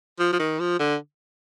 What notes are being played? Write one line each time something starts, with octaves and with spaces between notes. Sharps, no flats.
F3
F3
D#3
F3
D3